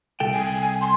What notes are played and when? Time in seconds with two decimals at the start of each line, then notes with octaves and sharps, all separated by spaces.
0.20 C2 A4 G5
0.33 G#5
0.81 C6